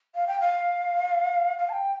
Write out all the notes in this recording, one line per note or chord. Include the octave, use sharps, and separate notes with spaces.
F5
G5
F5
F5
A5
G5